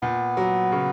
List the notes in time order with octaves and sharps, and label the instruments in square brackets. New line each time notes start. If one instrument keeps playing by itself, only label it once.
[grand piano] A#2 [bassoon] B3
[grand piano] F#3
C#3